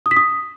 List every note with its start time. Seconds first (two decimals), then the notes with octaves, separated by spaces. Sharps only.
0.06 D#6
0.11 B6
0.17 D#6